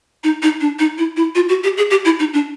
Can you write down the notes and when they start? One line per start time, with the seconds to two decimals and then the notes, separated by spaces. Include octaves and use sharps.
0.24 D#4
0.42 D#4
0.61 D4
0.79 D#4
0.98 E4
1.17 E4
1.35 F4
1.49 F#4
1.64 G4
1.77 G#4
1.91 G4
2.05 E4
2.19 D#4
2.33 D4